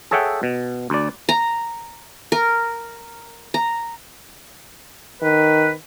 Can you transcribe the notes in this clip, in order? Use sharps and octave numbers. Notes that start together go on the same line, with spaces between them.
G#4 A4 C#5 E5 F#5 G5
B2
D2 D5
A#5
A#4
A#5
D#3 B4